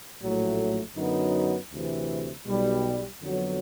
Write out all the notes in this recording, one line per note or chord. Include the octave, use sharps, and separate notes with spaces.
A#1 A2 F#3 A3
F#2 D3 F#3 B3 D#4
D2 C3 E3
B1 B2 G3
F2 D3 F#3 B3